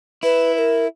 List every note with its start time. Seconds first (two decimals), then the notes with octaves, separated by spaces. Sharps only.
0.23 E4 B4
0.54 B4
0.58 A#4